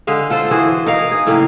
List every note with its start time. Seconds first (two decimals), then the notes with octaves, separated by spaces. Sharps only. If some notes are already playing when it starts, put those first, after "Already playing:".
0.07 D3 G#3 F5
0.30 F4 A4 C5
0.51 E3 F#4 G#4 C5
0.86 D#4 A#4 F5
1.11 G#4
1.27 A2 C#3 A#3 F5